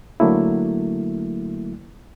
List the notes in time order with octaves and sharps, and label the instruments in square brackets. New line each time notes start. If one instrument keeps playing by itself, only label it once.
[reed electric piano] D3 F#3 A3 A#3 E4